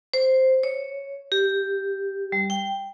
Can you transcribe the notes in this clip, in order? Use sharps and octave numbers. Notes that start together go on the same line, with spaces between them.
C5
C#5
G4
G3
G5